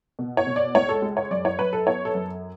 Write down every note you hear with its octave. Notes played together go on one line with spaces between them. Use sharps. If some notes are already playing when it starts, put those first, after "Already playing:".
B2
C#5
B2
D5
C#2 C#5
A4
G#3
C#5
F#2 D5
C#5
F#2 B4
A4
B3 C#5
A4
F#2